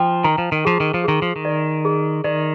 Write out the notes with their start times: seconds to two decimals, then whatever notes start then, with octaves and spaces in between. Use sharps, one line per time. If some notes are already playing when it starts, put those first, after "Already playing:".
Already playing: F3 G5
0.24 D#3 A#5
0.38 F3
0.52 D#3
0.65 F3 G#4
0.80 D#3
0.94 F3
1.04 D#3 G#4
1.22 F3
1.36 D#3
1.45 D5
1.85 G#4
2.24 D#3 D5